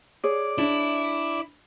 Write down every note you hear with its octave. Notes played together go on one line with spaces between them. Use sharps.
G#4 C#5 D5
D4 E4